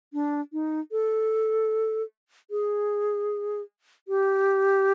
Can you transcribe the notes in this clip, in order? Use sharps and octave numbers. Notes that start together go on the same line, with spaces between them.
D4
D#4
A4
G#4
G4